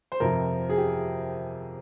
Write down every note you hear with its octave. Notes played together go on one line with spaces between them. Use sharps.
C5
F2 C3 F3 A#4
G#4
G4